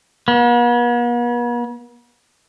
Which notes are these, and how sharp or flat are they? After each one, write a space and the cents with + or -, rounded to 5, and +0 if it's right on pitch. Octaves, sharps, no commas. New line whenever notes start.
B3 -45